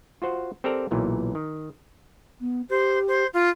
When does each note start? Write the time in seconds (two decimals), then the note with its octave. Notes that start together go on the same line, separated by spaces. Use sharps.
0.22 F4 F#4 C5 F#5
0.64 C4 G4 A4 A#4 D5 A#5
0.91 B1 A#2 E3 F#3
1.35 D#3
2.41 B3
2.70 G4 C5
3.08 C5
3.33 F4